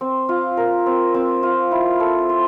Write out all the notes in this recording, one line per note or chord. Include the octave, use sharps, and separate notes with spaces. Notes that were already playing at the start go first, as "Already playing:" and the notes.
C4
F4
A#4
C4
C4
F4
E4
A4
C5